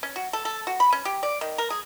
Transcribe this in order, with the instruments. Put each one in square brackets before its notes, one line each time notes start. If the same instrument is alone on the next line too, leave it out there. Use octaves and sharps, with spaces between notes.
[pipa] C#4
F#4
A4
A4
F#4
B5
C#4
G4
D5
D#3
A#4
G#4